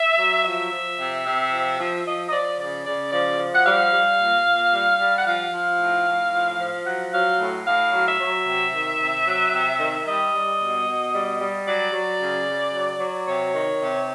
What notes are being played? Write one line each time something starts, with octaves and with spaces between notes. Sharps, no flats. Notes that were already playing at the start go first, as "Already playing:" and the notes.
Already playing: E5
F#3
F3 E5
F3
C3
C3
F3
F3
F3 D#5
D#5
F3 D5
C#3 D5
C#3 D5
F3 D5
F3
F#5
G3 F5
G3
A#2
A#2
G3
G3
F#5
F3 F5
F3
A2
A2
F3
F3
F#3 F#5
F#3 F5
A2
A2 F5
F#3
E5
F#3
C3
D#3
C3
F#3
C3
D#3
G3 D#5
G3
B2
B2
G3
G3
F#3 D5
F#3
C#3
C#3
F#3
F#3
C3 C#5
D#3
C3